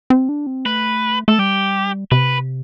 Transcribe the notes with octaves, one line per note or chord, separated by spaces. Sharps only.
C4
D4
C4
A3 B4
A3 A4
G3 G4
C3 B4